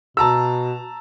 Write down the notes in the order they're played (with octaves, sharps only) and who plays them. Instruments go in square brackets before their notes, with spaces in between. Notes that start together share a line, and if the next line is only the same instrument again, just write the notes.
[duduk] B2 [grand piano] A5 A#5 E6